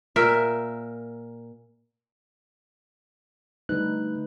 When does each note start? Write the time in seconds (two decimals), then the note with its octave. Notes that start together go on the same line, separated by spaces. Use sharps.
0.16 A#2 A#4 E5
3.69 D3 G3 A3 D#4 B4 F#6